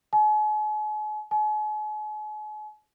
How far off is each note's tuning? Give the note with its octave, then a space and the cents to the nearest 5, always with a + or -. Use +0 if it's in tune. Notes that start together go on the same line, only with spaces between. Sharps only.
G#5 +45
G#5 +45